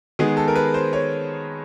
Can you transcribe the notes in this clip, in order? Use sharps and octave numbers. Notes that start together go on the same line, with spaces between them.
D#3 G#3 B3 G#4
A4
A#4
B4
C5
C#5